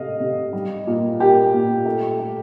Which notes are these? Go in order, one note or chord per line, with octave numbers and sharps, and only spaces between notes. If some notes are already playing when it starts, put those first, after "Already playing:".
Already playing: C3 A3 D#5 F5
C3
G3
A#2
A#3 G4
A#2
A3
A3